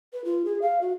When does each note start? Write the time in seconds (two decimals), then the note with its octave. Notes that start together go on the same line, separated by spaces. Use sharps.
0.13 B4
0.25 F4
0.45 G#4
0.62 F5
0.81 F#4